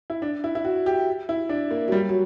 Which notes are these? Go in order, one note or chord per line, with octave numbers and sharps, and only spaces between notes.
E4
D4
E4
E4
F#4
G4
E4
D4
A#3
F#3
G3
F#3